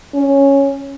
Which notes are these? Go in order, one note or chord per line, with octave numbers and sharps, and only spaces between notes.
C#4